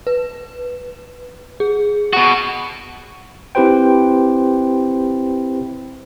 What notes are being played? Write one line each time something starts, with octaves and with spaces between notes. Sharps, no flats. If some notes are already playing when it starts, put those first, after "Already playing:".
B4
G#4
B2 F#4
C4 E4 G4 B4 C5 G5